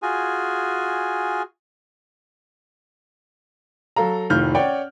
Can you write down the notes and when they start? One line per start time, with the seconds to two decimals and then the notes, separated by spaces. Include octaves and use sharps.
0.02 F4 F#4 G#4 G#5
3.96 F#3 A4 F5 A#5
4.30 F1 A2 D#3 F4 F6 G6
4.55 C#4 C#5 D5 F#5 G5